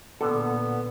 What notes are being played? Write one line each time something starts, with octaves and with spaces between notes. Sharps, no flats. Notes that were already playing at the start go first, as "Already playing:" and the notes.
A#2 D3 B3 A4